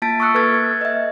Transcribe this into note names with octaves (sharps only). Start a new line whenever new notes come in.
A#3 F4 A5 A6 B6 D7
C#6 D#6 E6 F#6 C#7
A#3 A4 B4 F6 G#6 A6
G#6
D#5 E5